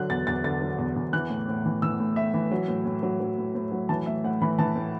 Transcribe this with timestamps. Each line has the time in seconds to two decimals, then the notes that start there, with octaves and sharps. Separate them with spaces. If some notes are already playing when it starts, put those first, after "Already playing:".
Already playing: D3 F#3 F#6
0.10 E2 A6
0.27 E2 A6
0.44 D3 A6
0.62 F#3
0.78 E2
0.96 E2
1.13 E3 F#6
1.30 A2
1.48 A2
1.66 E3
1.82 E3 E6
2.00 A2
2.16 A2 E5
2.34 E3
2.51 F#3
2.68 A2
2.85 A2
3.03 F#3
3.20 F#3
3.38 A2
3.55 A2
3.72 F#3
3.89 E3 A5
4.06 A2 E5
4.24 A2 F#5
4.42 E3 B5
4.59 E3 A5
4.76 A2